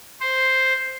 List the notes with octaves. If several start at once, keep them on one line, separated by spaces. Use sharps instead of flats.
C5